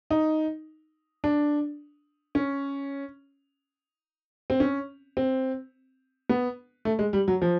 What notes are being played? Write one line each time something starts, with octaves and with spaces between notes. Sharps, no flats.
D#4
D4
C#4
C4
C#4
C4
B3
A3
G#3
G3
F#3
F3